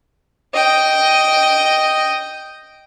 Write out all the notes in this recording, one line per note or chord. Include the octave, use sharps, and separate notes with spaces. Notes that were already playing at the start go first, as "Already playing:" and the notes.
D#5 G5